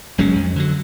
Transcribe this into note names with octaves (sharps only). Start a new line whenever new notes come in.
F#1 F#3 G#3 C#4
F2
D3 F#3